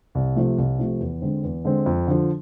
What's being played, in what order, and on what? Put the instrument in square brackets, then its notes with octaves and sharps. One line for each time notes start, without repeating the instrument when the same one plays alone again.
[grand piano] C2
C3 F3 A3
C2
C3 F3 A3
E2
D3 G#3 C4
E2
D3 G#3 C4
F2
D3 F3